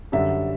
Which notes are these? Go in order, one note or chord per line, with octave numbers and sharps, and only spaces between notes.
F#2 D3 G3 E5